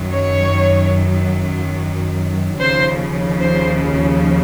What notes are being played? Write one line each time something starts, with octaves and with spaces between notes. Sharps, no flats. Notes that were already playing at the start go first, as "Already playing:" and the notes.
Already playing: F#2 D#3 F#3
C#5
D#2 C#3 F3 C5
C5